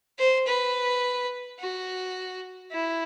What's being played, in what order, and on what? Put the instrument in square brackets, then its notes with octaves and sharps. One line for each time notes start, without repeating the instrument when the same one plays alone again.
[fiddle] C5
B4
F#4
E4